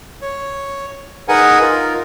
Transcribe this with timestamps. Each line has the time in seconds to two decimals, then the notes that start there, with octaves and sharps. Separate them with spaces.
0.22 C#5
1.28 D#4 G#4 A#4 B4 F#5 G#5
1.61 D#4 F4 A#4